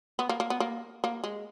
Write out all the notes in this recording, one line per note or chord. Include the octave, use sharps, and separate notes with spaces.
B3
A#3
A#3
B3
A#3
A#3
G#3